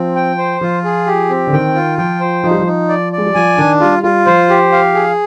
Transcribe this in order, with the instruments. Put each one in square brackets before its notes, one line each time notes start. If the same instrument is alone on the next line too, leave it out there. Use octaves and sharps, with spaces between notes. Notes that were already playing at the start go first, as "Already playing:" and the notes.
Already playing: [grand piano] F3 [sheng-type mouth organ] C4
[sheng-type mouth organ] G5
C5
[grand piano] F3 [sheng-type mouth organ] F4
[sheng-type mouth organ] G#4
G4
C4
[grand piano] D3
[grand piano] D#3 [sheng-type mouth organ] G5
[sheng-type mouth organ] F4
[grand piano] F3 [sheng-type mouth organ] G5
[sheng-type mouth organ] C5
[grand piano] F3 [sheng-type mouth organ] D#4
[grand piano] G3
F3
[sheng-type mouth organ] D#4
D5
D5
[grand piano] G#3
G3
[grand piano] F3 [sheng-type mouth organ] G#5
[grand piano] D#3 [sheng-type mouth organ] D4
[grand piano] G3 [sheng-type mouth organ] F4
[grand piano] G3 [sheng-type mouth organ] F4
[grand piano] F3 [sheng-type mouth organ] C5
[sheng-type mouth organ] G4
F5
G#4